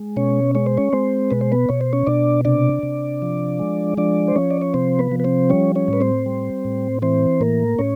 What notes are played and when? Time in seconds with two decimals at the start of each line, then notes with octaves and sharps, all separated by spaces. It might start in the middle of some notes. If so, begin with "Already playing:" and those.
Already playing: G#3
0.17 B2 C#4 C#5
0.55 G#3 C#5
0.66 C5
0.77 C#4 C#5
0.93 G#3 C4 C5
1.31 B2 B4
1.41 C5
1.52 B3 B4
1.69 B2 C#5
1.81 C5
1.93 C#4 C#5
2.07 B2 D4 D5
2.45 C3 D4 D5
2.83 C3
3.22 F3
3.59 G#3
3.97 F3 D4 D5
4.28 C5
4.36 F3 C#4 C#5
4.51 D5
4.62 C#5
4.74 C3 C4 C5
4.99 B3 B4
5.12 F3
5.20 B4
5.24 C4 C5
5.50 G3 C#4 C#5
5.76 C#4 C#5
5.88 A2 B4
6.01 C4 C5
6.26 G3
6.65 A2
7.02 E3 C4 C5
7.41 A2 A#3 A#4
7.79 A2 C#4 C#5